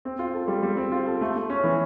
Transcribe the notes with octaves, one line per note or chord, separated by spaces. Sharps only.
C4
F4
A4
G3
G3
C4
F4
A4
A3
A3
C#4
E3